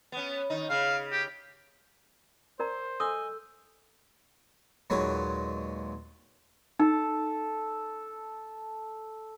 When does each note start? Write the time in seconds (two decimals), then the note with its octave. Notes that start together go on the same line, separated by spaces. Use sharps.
0.12 B3 C#4
0.50 D#3 D#4
0.70 C#3 F5
1.12 G4
2.60 A#4 C5 D5 A#5
3.00 A4 D#5 G#5 D#6 E6 G6
4.90 D#2 A#2 F#3 G#3 B4 C#5
6.79 D#4 A4